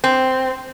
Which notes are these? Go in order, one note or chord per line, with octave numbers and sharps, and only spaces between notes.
C4